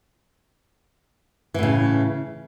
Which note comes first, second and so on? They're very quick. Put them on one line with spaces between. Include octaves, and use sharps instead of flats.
E3 A2 C#3